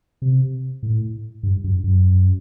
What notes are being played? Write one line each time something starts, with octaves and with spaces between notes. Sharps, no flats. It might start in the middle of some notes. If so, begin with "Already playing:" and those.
C3
A2
G2
F#2
F#2